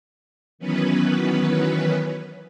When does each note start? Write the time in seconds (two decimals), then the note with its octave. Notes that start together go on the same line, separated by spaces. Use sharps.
0.59 D#3 E3 F#3 B3 C#4 B4